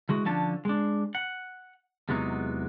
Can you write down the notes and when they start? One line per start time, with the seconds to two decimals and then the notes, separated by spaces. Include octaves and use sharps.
0.09 E3 G#3 F#4
0.25 D3 F3 C#4 D4 A5
0.65 G#3 D4
1.15 F#5
2.09 E2 C3 F#3 G#3 B3 D#4